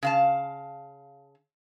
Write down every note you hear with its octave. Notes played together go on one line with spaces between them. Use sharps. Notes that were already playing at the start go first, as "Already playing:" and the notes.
C#3 F5 A5